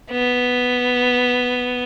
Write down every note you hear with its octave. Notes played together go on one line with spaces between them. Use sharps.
B3